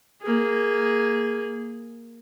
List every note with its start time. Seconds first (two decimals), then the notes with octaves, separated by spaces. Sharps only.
0.22 A#3 G#4